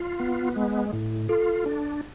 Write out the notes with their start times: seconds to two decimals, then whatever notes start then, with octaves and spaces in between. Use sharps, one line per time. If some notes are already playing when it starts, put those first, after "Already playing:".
Already playing: F4
0.20 B3
0.56 G#3
0.93 A2
1.29 F4 A4
1.66 D4